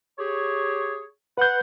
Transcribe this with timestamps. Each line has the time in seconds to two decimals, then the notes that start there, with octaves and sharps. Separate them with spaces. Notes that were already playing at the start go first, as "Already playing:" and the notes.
0.19 G4 G#4 C#5
1.38 B4 F#5 G6